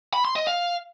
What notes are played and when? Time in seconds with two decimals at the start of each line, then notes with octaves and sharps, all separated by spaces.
0.14 B5
0.25 C6
0.36 D#5
0.47 F5